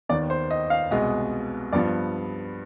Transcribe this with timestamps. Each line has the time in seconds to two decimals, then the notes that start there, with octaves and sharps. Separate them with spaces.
0.09 D#2 D#3 B3 D5
0.30 C5
0.51 D#5
0.70 F5
0.91 C2 B2 G#3 B3 D#5
1.73 G2 F3 B3 D5